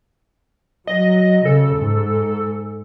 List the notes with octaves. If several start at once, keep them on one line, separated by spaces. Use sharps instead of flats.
F#3 D#5
C#3 A4
G#2